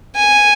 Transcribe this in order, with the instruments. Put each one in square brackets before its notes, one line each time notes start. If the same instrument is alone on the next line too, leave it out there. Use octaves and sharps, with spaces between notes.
[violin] G#5